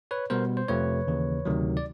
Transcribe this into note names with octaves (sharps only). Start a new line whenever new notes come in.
B4 C#5
B2 G3 B3 A#4 C5
C5
F2 C3 F3 A3 B4 C#5
D#2 C#3 E3
D2 C3 D#3 F#3
D5